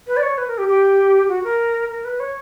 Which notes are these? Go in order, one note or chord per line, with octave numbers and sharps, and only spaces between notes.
B4
D5
C#5
B4
A#4
G4
G4
F#4
A#4
A#4
B4
C#5